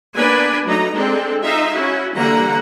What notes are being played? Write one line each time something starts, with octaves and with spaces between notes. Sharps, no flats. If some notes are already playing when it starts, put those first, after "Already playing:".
A#3 B3 D4 B4 G#5
F#3 A3 D#4 A#5
G#3 C4 D4 A4
D#4 F4 E5 F5
C#4 E4 F#4
D3 E3 G3 A#3 F#5 A#5